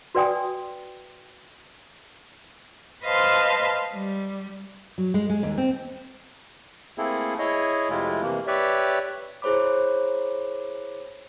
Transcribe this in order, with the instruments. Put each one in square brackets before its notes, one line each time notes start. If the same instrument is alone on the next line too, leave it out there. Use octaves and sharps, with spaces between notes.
[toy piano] F#4 B4 D5 G5 G#5 D#6
[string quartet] B4 C5 D#5 F5 A5 C6
G3
[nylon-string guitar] F#3
G#3
G#3
D#2
C4
[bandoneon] A3 A#3 C4 E4 G#4 A4
E4 G#4 C#5 D#5
F2 C3 G#3 A3 E4 F4
C3 E3 A#3
G4 B4 C#5 D5 E5
[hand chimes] E4 G#4 C5 C#5 B5 D6